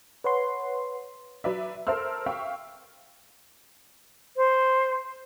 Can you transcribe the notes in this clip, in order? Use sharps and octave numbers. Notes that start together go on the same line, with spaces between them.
B4 C#5 F#5 C6
F#3 B4 D5 E5
A4 A#4 C5 C6 E6 F6
E5 F5 G5 C#6
C5